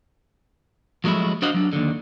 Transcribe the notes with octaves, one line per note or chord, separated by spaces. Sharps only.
F3 F#3 G#3 A3 E4
D4 F#4 C5 D#5 F5 F#5
F#3 D4
D#2 D3